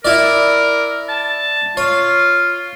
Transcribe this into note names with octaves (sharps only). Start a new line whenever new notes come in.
E4 A#4 D5
A5
F4 C#5